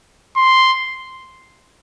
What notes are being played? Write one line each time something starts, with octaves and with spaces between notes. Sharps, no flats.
C6